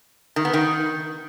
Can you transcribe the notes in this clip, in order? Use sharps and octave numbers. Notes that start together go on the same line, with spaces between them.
D#3
B3
D#3